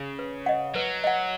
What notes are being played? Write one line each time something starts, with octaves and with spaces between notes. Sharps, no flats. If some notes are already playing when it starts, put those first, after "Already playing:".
Already playing: C#3
B4
D#5 F#5
F#3 B4
D#5 F#5